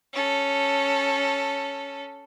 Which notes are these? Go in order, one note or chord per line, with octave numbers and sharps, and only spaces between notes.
C#4 A4